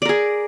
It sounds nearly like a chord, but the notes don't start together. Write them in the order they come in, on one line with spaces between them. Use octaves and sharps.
D5 A#4 G#4